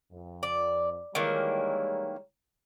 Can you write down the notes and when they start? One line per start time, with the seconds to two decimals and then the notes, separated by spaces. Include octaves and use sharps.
0.12 F2
0.43 D5
1.15 D#3 E3 G3 G#3 A#3 C#5